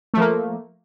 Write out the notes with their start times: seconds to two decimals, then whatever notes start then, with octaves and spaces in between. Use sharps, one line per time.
0.14 A3
0.17 F3
0.20 A#3